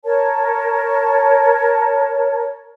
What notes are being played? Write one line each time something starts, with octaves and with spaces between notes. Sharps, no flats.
A#4 C#5 A5